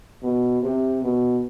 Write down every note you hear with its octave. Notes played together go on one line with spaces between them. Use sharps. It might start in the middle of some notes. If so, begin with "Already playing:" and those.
B2
C3
B2